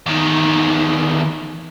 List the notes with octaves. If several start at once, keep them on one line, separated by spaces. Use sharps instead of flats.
E2 D#3